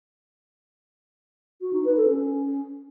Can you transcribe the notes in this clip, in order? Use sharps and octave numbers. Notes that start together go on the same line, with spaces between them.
F#4
D#4
B4
A4
C#4